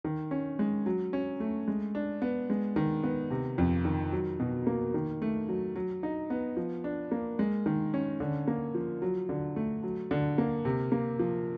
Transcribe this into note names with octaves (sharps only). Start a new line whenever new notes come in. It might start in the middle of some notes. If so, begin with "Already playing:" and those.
D#3
C#4
G#3
F#3
C#4
A3
G#3
D4
B3
G#3
D#3
B3
C3
F2
D#3
F#3
B2
A#3
D#3
A3
F#3
F#3
D#4
B3
F3
D4
A#3
G#3
D#3
C#4
D3
A#3
F3
F#3
D3
A3
F#3
D3
A#3
C3
A#3
F3